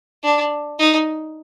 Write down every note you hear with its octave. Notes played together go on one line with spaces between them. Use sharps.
D4
D#4